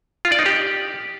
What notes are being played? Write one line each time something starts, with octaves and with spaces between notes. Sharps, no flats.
F4
D5
D#4
G4